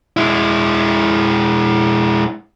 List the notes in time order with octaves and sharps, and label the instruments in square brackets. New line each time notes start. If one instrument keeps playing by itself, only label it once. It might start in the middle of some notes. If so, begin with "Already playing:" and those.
[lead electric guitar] G#3 E4